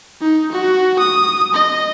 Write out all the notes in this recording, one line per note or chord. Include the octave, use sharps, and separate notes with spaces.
D#4
F#4
D#6
D#5